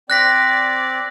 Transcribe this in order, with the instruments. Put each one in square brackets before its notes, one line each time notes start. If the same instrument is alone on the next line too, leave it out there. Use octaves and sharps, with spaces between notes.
[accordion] C4 D5 [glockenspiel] F#6 A#6 B6